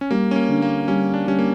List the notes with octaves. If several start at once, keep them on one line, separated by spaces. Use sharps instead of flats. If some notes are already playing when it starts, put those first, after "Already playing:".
C#4
G3 A#3
C#4
A#3
D3
A#3
G3 C#4
D4
G3 C#4
A#3